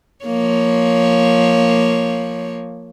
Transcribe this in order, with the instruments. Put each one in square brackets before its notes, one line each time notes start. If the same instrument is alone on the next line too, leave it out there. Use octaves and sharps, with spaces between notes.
[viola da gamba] F3 A#3 C#5